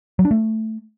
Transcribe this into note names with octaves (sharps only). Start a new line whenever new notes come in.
F#3
D4
A3